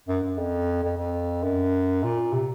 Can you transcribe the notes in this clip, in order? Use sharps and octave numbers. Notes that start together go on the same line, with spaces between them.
F#2
F#2
F2
F2
F2
F#2
A#2
C3